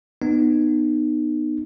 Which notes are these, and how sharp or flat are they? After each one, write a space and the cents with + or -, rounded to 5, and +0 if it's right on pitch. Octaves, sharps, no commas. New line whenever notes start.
B3 +0 D#4 -30